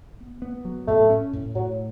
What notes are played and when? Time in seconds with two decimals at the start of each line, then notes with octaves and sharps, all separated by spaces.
0.20 B3
0.42 B3
0.65 F#3
0.87 A2 A3
1.09 C#4
1.33 A2
1.55 A2 F#3